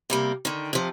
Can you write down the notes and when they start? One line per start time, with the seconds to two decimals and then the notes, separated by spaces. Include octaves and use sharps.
0.10 C3 G3 A#3
0.45 D3 D#3
0.73 C3 F3